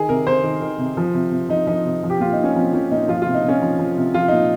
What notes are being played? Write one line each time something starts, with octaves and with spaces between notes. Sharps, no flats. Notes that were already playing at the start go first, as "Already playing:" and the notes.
Already playing: D#3 G#4
C3 A#4
C3 C5
D#3
D#3
C3
F3
C3
C3
F3 D#4
F3 D#4
C3
F3
G4
A#2 F4
D#4
A#2
C#4
F3 C4
F3 C#4
A#2 D#4
F3 F4
C3 F4
D#4
C3 C#4
F3
F3
C3
F3 F4
A#2 D#4